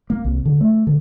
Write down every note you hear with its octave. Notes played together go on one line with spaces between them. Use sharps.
A#3
C2
D3
A3
D3